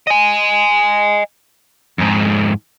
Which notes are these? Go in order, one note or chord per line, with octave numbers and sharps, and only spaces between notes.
D#5 G#5
F2 G#2